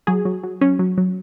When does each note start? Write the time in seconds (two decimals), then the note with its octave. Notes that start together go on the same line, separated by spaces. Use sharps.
0.07 F#3 G#4
0.25 F#3
0.44 F#3
0.61 F#3 C#4
0.79 F#3
0.98 F#3